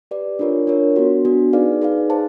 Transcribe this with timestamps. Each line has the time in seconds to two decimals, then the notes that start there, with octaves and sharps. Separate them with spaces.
0.11 G4 B4 D5
0.39 D4 F4 A#4 C#5
0.67 D4 F4 A#4 C#5
0.96 B3 D4 F#4
1.25 B3 D4 F#4
1.53 D#4 G#4 B4 D5 F5
1.81 D#4 G#4 B4 D5 F5
2.10 G#4 C5 F5 A5